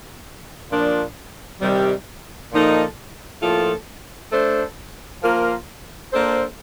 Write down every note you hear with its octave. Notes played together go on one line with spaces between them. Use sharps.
A#2 F3 A#3 D4
C3 D#3 G3
A#2 F3 A#3 D#4 A4
A2 F3 A#3 F4 A4
A3 D4 A4 C5
F3 A#3 F4 A#4
A#3 D4 A4 C5